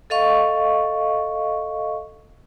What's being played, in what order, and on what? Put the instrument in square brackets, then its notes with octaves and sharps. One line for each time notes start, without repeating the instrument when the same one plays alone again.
[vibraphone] A4 D#5 F5 C#6